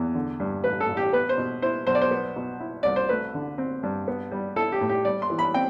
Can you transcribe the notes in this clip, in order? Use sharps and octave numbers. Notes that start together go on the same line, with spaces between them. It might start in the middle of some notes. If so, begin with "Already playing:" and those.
Already playing: E2
D3
G2
A1 B4
A4
A1
G4
B3 B4
C5
B2
E4 C5
B1 C5
D5
C5
B3
B2
E4
C2 D5
C5
A3 B4
D3
C4
G2
B3
G3
E4 A4
G4
A2
G4
G3 D5
C6
E3
B5
C4 G5